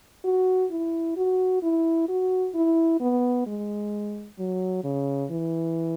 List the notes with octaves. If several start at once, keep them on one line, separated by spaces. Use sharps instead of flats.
F#4
E4
F#4
E4
F#4
E4
B3
G#3
F#3
C#3
E3